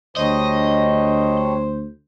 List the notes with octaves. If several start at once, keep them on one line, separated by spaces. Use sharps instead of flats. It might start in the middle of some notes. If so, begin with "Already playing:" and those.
D2 G3 D4 C5 C#5 D#5